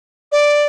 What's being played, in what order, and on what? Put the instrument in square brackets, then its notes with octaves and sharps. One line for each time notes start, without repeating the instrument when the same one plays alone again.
[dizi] D5